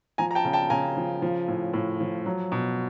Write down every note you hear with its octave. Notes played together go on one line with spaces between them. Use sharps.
F3 G#5 A#5
A#5
G5 A5
C#3
G5 A5
C#3 G#5 A#5
F3
F3
A2
A2
F3
F#3
B2